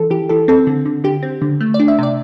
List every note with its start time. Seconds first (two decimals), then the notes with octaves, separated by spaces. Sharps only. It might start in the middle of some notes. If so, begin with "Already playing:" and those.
Already playing: E3 A4
0.10 E3 G4
0.29 E3 A4
0.48 C4 A4
0.67 D3
0.85 D3
1.04 D3 G4
1.23 C4
1.42 D3
1.61 A3
1.74 D5
1.80 D4
1.88 E5
1.98 C3 D5